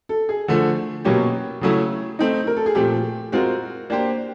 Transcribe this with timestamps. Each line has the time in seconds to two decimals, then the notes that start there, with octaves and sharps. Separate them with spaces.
0.09 A4
0.29 G#4
0.48 D3 F3 A3
1.05 B2 F#3 A#3 C#4 G4
1.61 C#3 F#3 A3 C#4 E4
2.19 A3 C4 D#4
2.47 A#4
2.57 A4
2.66 G#4
2.75 A#2 F3 A3 C4 G4
3.32 G#3 C4 F4 F#4 A#4
3.90 A#3 D4 G4 C5